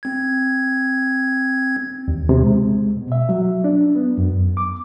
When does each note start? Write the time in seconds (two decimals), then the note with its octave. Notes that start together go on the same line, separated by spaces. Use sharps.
0.03 C4 G#6
2.08 D#2
2.29 C3
2.42 G#3
2.97 B2
3.12 E5
3.29 F#3
3.64 D4
3.95 B3
4.18 F#2
4.57 D6